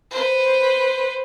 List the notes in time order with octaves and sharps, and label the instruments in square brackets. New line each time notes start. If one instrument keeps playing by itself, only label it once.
[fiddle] B4 C5